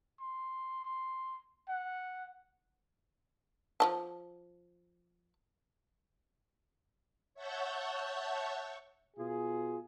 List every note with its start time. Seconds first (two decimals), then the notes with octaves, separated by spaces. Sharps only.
0.20 C6
0.84 C6
1.68 F#5
3.80 F3 D#5 A5
7.34 C#5 E5 F#5 A5 C#6 G6
9.17 B2 F4 G#4